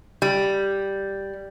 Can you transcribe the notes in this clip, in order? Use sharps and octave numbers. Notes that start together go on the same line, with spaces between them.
G3